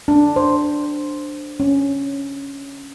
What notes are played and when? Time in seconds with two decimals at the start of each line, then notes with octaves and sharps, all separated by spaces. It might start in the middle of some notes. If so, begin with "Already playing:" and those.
0.08 D4
0.36 C5
1.60 C#4